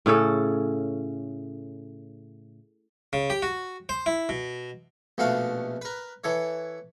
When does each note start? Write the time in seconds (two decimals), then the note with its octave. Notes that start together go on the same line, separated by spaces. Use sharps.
0.06 A2 C#3 C#4 A4
3.13 C#3
3.30 G4
3.42 F#4
3.89 C5
4.06 E4
4.29 B2
5.18 A#1 B2 A3 F#4 F5
5.82 A#4 B4
6.24 E3 A4 C#5